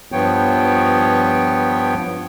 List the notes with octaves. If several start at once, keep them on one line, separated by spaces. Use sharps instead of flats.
G2 F3 B3 C#5 G5